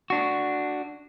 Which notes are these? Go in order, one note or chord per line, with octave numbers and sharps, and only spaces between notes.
D4 F#4